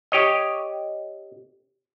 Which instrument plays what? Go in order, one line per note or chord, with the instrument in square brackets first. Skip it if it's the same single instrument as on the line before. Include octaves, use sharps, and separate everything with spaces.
[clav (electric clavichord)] G4 C#5 D#5